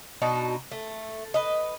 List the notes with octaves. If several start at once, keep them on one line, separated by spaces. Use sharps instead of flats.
B2 D4 D#4 F#4
A3
B4 D#5